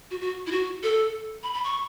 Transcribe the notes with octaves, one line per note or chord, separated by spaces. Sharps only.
F#4
F#4
E4
F#4
A4
B5
B5
C#6